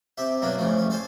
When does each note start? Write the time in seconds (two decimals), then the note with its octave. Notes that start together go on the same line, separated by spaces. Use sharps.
0.18 C3 G4 E5
0.42 B2 F#3 A#3 B3 D4
0.57 F2 C#3 E3 F3 A3
0.77 A1 G3 C#4
0.90 A4 C5 G#5